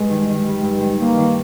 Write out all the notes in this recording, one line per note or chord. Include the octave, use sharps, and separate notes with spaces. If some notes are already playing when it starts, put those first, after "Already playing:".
Already playing: G2 G3 G#3
D#3
D#3
G3
G2
D#3
G2 A#3
D#3